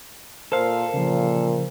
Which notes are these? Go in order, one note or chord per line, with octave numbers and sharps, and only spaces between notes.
A#2 A4 A#4 C5 F5
A#2 C#3 F3